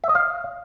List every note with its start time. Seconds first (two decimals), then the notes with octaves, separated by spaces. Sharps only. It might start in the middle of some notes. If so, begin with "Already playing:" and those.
0.04 E5
0.09 D#5
0.15 F5